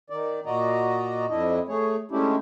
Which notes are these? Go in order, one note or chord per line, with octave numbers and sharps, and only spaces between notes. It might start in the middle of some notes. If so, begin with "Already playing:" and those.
D#3 D5
A#2 F#4 D5 D#5 A#5
F2 D4 E4 D#5
A3 G#4 C#5
G#3 A3 C#4 D4 E4 G4